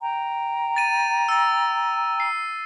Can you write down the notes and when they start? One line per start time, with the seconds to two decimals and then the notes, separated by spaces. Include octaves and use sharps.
0.01 G5 A#5
0.76 A6 D#7
1.29 E6 A6
2.20 C7